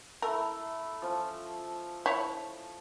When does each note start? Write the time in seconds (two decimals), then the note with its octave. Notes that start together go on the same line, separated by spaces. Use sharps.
0.22 A3 E4 A#4
1.02 F3 C#4
2.06 E4 C#5